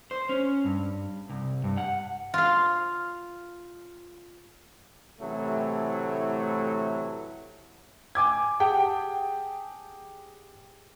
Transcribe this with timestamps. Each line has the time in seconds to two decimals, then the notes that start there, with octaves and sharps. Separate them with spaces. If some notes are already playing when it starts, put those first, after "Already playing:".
0.11 C5
0.29 C#4
0.65 G2
1.29 C2
1.64 G2
1.77 F#5
2.34 F4 F5
5.20 A2 C3 E3 F#3 A3
8.15 G#5 D6 G#6
8.60 G4 G#4 F#5 G5 A5